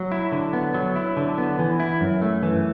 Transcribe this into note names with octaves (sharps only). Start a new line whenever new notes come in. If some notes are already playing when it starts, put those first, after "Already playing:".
Already playing: F#3
E4
D3
B3
F#3
E4
D3
B3
E3
E4
F#2
A3
E3